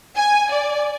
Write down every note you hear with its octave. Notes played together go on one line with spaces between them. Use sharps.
G#5
D5